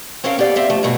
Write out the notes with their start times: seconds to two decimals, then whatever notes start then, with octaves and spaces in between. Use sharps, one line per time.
0.24 C4 C#4 A4 A#4 F5
0.38 B3 G4 A4 D5 F5
0.56 C4 E5 F5
0.70 F3 A3
0.83 G2 B2 A3 F#4 G#4